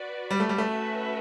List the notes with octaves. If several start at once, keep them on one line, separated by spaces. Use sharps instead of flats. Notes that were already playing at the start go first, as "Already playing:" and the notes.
Already playing: F#4 B4 D5
G3
A3
G3
A3 C#4 F#4 B4 E5